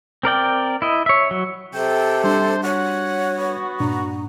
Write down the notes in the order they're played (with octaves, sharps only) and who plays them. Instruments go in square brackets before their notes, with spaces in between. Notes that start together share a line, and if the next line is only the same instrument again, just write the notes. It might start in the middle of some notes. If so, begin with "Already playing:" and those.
[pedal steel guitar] C4 A#4 D5 G5
E4 D#5
C#5 E5
F#3
[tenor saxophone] C3 [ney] A4 [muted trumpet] G5
[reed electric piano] G3 D4 [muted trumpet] C5
[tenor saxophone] F#4 [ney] C#5 [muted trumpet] F#5
[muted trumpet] B3
[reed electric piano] G2 A#2 D4 [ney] A#5